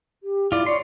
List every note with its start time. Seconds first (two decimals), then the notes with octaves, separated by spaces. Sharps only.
0.23 G4
0.52 E4 F4 D5
0.66 C#5 D5 C6